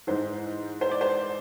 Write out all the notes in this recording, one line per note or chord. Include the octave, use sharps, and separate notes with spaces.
G#2 E3 C5
C5
D5
C5